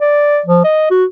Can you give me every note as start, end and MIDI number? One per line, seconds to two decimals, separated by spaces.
0.01 0.40 74
0.46 0.63 53
0.64 0.88 75
0.90 1.05 66